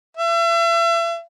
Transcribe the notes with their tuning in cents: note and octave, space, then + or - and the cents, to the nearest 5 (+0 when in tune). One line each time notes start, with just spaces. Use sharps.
E5 +40